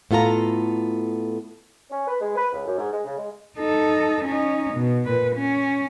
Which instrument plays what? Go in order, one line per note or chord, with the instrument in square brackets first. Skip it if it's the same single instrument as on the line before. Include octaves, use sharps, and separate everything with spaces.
[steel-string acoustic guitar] A2 B3 F4 A4 A#5
[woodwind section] C#4
B4
G#3
B4
C#2
F#2
G#2
G#3
C#3
G#3
[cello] D#4 A4
C#4 D#4
B2
A#2 B4
C#4